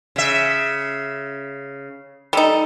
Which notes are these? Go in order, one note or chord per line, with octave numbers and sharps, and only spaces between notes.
C#3 E5
G3 D#4 A4